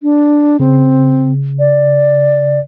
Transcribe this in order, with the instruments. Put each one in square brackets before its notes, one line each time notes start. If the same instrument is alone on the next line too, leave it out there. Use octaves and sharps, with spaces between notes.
[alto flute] D4
[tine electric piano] C#3 [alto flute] C4
[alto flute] D5